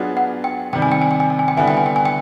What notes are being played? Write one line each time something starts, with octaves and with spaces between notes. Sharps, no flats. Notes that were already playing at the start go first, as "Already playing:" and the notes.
Already playing: F#3 B3 D4 F4 G#4
F#5
G5
C3 D#3 G3 G5
G#5
G5
G#5
G5
G#5
G5
G#5
G5
D3 G3 B3 E4 G#5
G5
G#5
G5
G#5
G5